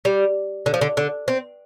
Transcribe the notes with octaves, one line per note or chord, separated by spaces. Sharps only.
G3
D3
F3
D3
D3
C4